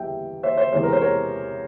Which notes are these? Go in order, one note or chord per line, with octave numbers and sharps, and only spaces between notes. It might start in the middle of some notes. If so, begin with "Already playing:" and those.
Already playing: E2 E3 G3 E5 G5
C5 E5
C5
E2 C3 E3 G#3 C5
A#4
C5
A#4 C#5